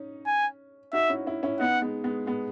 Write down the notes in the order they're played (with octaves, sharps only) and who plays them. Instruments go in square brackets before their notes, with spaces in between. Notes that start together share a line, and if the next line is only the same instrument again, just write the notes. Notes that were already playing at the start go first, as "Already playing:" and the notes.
Already playing: [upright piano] C#4 D#4
[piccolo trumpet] G#5
[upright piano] D#4 F#4 [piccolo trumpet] E5
[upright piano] C#4 E4
C#4 E4
C#4 E4
[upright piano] B3 D#4 [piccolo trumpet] F#5
[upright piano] G#3 B3
G#3 B3
G#3 B3